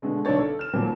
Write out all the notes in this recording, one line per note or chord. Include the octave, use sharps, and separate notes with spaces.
B2 D3 G#3 A3
B1 D3 D4 D#4 C#5 A6
A4
F6 E7
D#2 A#2 F3 F#3 A#3